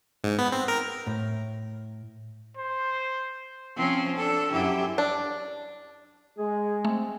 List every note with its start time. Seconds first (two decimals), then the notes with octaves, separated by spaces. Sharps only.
0.24 G#2
0.38 B3
0.52 C4
0.68 A#4
1.07 A2
2.57 C5
3.76 F3 C4 C#4
4.16 D4 A4
4.52 F#2 E4 G4
4.98 D4
6.38 G#3 G#4
6.85 A3 C4